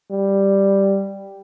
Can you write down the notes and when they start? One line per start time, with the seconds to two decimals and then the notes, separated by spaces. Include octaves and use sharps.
0.10 G3